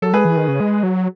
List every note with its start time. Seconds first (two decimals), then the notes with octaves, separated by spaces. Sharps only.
0.02 F#3 A4
0.13 G#3 G#4 B4
0.25 E3
0.37 D#3
0.48 C#3
0.60 G#3
0.83 F#3